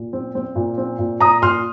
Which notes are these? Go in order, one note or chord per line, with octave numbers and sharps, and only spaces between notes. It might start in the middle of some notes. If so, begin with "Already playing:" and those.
Already playing: A#2
C4
C4
A#2
C4
A#2
A#2 A#5 D#6
A#2 C6 F6